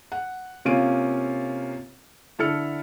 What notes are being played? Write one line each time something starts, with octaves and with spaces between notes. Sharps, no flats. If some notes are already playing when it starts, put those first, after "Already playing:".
F#5
C3 A#3 C#4 F4 D7 D#7
D3 E4 A4 F6 C#7